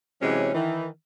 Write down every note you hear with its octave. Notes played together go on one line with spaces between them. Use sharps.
C3 E3 F#3 G#3 C#4
D#3 E3